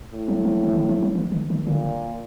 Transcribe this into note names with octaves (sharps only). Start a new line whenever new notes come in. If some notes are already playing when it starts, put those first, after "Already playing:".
A2
F#3
F3
E3
D#3
F3
F#3
E3
D#3
D#3
A#2 D3